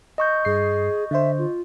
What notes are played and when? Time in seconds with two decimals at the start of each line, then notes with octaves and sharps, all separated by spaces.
0.18 D#5 C#6 G6
0.45 G2 G#4 C7
1.11 D3 C5 E5
1.38 F4